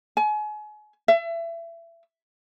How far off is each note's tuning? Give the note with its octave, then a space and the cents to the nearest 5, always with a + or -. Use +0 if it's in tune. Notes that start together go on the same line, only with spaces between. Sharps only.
G#5 +35
E5 +30